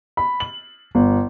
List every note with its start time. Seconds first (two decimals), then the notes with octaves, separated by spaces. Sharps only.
0.17 B5
0.40 F#7
0.95 G1